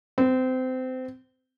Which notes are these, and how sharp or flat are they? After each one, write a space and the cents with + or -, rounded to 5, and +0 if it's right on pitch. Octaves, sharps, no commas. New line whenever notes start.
C4 -25